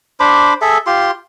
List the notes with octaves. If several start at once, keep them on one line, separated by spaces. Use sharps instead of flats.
D4 C5 B5 D6
G#4 A4 E5
F4 G4 C6